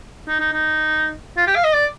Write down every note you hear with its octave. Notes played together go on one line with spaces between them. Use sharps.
D#4
D#4
D#4
F4
G4
F5
D#5
D5